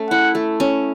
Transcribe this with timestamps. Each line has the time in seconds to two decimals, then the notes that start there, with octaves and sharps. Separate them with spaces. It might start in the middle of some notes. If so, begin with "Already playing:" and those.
Already playing: A3 C#4
0.10 E4 F#5
0.35 A3
0.60 C#4